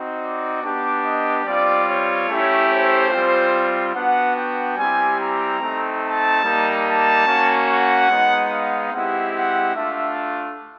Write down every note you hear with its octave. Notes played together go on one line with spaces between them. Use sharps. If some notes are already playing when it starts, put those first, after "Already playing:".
Already playing: C4 D#4 F#4
D5
B3 D4 G4
D#5
G3 C4 F4 D5
C#5
A3 C#4 E4 G4
C5
G3 C4 F4
B3 D4 F#4 F#5
G5
G3 C4 E4 G4 G#5
A#5
A3 C4 D#4
A5
G3 A#3 D#4
A5
A#3 C#4 F#4
F#5
G#3 B3 D#4
F5
G#3 C4 E4 G4 F#5
F#5
A3 D4 F4 E5